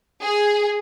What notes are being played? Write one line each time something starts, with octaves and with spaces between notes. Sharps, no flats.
G#4